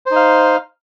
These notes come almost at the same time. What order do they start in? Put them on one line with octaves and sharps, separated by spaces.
C5 D#4 F5